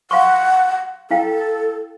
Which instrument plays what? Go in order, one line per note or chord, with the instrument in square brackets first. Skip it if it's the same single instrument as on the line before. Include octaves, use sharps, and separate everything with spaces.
[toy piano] F5 C6 C#6 [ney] F#5
[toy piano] E4 F5 G5 [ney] A4